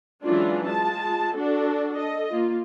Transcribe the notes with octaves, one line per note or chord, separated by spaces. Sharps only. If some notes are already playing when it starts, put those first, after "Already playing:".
E3 F#3 G#3 C#4 D4 F4
G#3 F4 A5
D4 F#4 A4
A4 D#5
A#3 F4